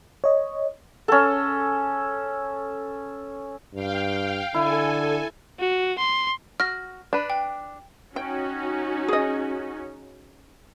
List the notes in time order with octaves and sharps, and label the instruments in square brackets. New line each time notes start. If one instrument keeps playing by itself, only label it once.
[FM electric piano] C#5 D#5
[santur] C#4 A4
[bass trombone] G2 [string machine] F5 G5
[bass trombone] D3 [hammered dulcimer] E4 [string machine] A4 G#5
[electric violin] F#4
C6
[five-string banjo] F#4 [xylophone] F6 A#6
[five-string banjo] D4 B4
[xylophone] G5
[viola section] C#4 D#4 F#4 [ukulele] G5
[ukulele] G#4 D#5